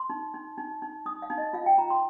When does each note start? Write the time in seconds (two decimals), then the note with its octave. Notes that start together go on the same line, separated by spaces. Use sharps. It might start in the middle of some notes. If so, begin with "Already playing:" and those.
Already playing: C6
0.10 D#4
0.34 D#4
0.58 D#4
0.82 D#4
1.06 D#4 D#6
1.22 F5
1.30 D#4
1.38 D#5
1.53 F4 F5
1.66 G5
1.77 F4 A#5
1.90 C6